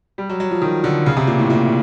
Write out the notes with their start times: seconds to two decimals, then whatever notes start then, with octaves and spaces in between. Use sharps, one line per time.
0.18 G3
0.29 F#3
0.40 F#3
0.51 F3
0.62 D#3
0.84 D3
1.06 C#3
1.17 C3
1.27 A#2
1.39 A2
1.50 A#2